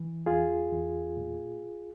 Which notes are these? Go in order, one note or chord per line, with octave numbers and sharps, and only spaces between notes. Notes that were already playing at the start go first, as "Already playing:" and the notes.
Already playing: E3
E2 F4 G#4
E2
A#2